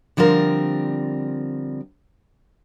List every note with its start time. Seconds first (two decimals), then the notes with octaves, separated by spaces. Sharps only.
0.17 D3 F3 G3 C4 A#4